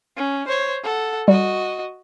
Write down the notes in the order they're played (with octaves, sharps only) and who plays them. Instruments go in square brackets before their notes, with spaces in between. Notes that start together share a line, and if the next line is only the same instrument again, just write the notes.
[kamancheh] C#4
C5 C#5
A4 F#5
[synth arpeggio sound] G3 [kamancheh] F#4 D#5